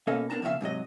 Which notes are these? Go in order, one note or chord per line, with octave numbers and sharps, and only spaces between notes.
B2 A#3 C#4 A4 D#5 F5
A#3 B3 D4 A5 A#5
F2 A#2 C#3 F#4 E5 F5
G#2 C3 F#3 D#5